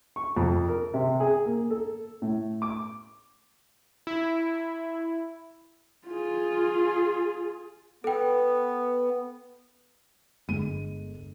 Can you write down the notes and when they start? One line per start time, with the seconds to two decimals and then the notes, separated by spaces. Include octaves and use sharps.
0.16 C#6
0.37 F2
0.68 A#4
0.94 C3
1.20 G#4
1.46 A#3
1.70 A4
2.22 A2
2.62 D6
4.07 E4
6.08 F4 G#4
8.04 B3 A4 G5
10.48 G1 G#3 D#7